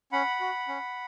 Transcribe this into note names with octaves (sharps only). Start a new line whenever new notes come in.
C#4 F#5 B5
F#4
C#4